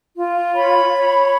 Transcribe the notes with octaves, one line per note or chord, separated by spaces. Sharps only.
F4
C#5 B5
C#5